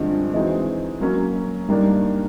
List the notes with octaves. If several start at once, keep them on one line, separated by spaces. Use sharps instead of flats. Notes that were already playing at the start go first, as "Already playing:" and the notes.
Already playing: G2 D3 F3 G#3 C4
E3 G#3 C4 D#4 F#4
F#3 A#3 C#4
G2 D#3 G3 A#3 D4